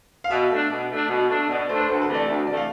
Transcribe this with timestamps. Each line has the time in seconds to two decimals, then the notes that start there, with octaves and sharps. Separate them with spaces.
0.24 F5
0.30 B2 E5
0.50 A3 D4
0.70 B2
0.90 A3 D4
1.09 B2
1.28 A3 D4
1.48 B2 D5
1.69 A3 D4 C5
1.79 B4
1.88 D2 A4
2.01 B4
2.08 C3 E3 A3
2.14 D5
2.28 D2 E5
2.47 C3 E3 A3 D5
2.57 F5